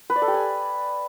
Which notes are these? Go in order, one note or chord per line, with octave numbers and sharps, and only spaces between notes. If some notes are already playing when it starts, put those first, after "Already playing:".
B4
D5
A4
G4
G#5